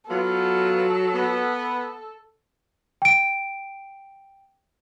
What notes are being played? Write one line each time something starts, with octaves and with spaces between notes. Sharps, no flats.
F#3 B3 F4 A4
B3
G5 D7